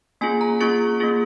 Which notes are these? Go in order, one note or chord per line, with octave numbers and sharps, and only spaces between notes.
A#3 C#4 F4 G#4 G#5
A#5
A#3 C#4 F4 G#4 C#6
A#3 C#4 F4 G#4